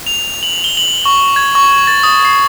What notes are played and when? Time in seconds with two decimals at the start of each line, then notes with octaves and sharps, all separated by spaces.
0.07 F7
0.43 F#7
0.64 G7
0.77 F#7
1.05 C#6
1.36 G#6
1.55 C#6
1.87 A6
2.03 D#6
2.25 C7